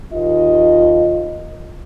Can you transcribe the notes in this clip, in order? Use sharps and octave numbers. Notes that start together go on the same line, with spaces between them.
D#2 F4 D#5